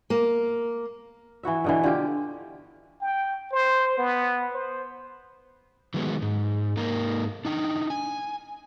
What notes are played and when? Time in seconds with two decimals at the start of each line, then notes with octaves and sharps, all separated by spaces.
0.10 A#3
1.43 E3 E4 F#4 E5
1.64 B2 D3 E3
1.84 D3 F4 G4
3.01 G5
3.53 C5
3.98 B3
4.54 C5
5.94 D#3 F#3 G#3 B3
6.22 G#2
6.77 G#2 A#3 D#4 A#4
7.45 D4 D#4 G5
7.90 G#5